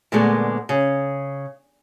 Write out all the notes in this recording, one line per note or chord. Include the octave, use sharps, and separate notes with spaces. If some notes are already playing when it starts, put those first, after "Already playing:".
A#2 D3 G#3 A3 B3
C#3